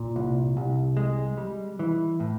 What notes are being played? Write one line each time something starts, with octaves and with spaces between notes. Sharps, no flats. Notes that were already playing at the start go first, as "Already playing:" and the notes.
Already playing: A#2
C2
C2
G#3
G3
E3
A2